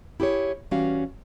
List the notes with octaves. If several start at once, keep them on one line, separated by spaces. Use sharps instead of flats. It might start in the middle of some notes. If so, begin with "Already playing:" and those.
E4 G4 G#4 C#5
E3 G3 C#4 F#4 F5